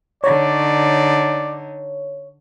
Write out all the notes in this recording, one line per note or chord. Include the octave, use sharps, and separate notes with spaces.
D3 D#4 C#5 D5